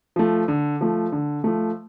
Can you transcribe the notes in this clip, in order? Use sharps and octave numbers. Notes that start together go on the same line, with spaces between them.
F3 A3
D3
F3 A3
D3
F3 A3